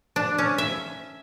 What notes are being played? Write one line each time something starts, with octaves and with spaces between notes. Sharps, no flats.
D4
C#4
E5